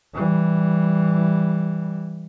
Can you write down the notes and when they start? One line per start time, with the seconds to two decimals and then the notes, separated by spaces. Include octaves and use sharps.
0.14 E3 G3